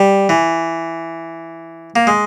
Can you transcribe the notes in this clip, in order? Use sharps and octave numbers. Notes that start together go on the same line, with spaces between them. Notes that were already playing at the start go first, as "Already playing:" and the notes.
Already playing: G3
E3
A#3
G#3